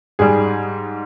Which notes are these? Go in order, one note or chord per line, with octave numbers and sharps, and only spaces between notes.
G#2 G3 G#4